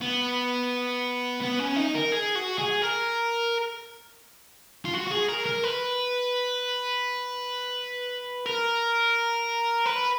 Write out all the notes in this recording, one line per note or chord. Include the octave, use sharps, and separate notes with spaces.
B3
B3
C#4
D#4
A#4
G#4
F#4
G#4
A#4
F4
F#4
F#4
G#4
A#4
A#4
B4
A#4
B4